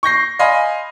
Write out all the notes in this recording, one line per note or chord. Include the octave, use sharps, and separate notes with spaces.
C#6 G6 A#6 C7
D#5 F5 G#5 B5 C6